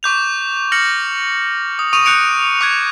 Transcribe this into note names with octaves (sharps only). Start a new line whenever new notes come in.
C#6 D6 G6 F7
F6 A#6 C#7 F#7
D#6
C#6 D#6 D#7 F7
F#6 G6 C#7 D7 F7
D6 F#6 G#6 D7